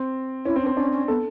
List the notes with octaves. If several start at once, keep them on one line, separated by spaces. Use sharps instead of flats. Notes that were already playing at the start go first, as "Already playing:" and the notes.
Already playing: C4
C#4 E4
C4
D4
C4
C#4 D4
C#4
B3 A4